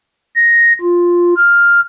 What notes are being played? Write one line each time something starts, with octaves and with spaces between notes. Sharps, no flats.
A#6
F4
F6